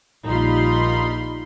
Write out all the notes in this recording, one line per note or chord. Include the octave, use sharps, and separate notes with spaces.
A#1 G3 D#4 F4 B5 C6